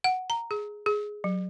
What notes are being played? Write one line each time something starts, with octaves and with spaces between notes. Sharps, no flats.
F#5
A#5
G#4
G#4
F#3